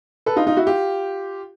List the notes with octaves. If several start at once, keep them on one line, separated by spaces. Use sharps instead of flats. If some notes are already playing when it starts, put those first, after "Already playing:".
A4 B4
D#4 F4
D#4 F4
E4 F#4
F4 G4